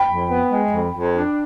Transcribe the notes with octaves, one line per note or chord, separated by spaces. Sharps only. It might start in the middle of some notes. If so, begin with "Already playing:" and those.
Already playing: G5 B5
F2
B3
G#3
F2
F2
D4